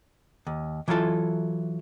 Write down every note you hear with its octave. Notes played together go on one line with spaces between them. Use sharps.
D#2
E3 F#3 E4 F4 A4